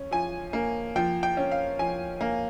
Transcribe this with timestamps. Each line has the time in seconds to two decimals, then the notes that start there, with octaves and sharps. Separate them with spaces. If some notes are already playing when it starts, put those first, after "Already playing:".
Already playing: C#4
0.11 F3 G#5
0.53 A#3
0.96 F3 G5
1.23 G5
1.37 C#4
1.51 F5
1.79 F3 G#5
2.21 A#3